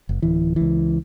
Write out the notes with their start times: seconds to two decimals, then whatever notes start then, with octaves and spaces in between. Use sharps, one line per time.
0.09 F#1
0.22 D1 E3
0.56 C#2 E3